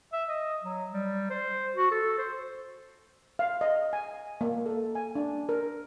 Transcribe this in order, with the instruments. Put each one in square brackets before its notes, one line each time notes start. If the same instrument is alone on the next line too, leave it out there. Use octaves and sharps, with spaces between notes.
[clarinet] E5
D#5
F#3
G3
C5
F#4
A4
C5
[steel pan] F5
D#5
G#5
A#3
A4
G#5
D4
A#4